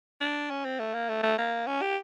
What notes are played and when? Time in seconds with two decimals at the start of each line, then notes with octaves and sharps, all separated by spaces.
0.21 D4
0.50 C#4
0.65 C4
0.79 A3
0.94 A#3
1.09 A3
1.23 A3
1.38 A#3
1.67 C#4
1.82 G4